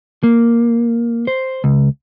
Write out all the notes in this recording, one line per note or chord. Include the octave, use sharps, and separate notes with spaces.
A#3
C5
C#2